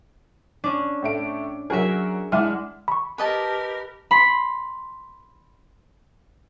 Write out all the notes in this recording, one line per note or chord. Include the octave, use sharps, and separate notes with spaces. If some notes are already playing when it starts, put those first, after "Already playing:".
C#4 D4
A2 A3 D7
F#3 F#4 G#4 A#4 E5
G#3 D4 E4 F#5 F6
B5 C#6
G4 A#4 B4 D#5 A5
B5 C6